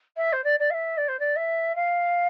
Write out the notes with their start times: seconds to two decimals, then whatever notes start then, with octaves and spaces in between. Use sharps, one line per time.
0.17 E5
0.33 C5
0.44 D5
0.59 D5
0.70 F5
0.74 E5
0.97 D5
1.08 C5
1.19 D5
1.36 E5
1.75 F5